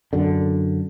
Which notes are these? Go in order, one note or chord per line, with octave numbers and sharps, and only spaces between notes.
F#2 D3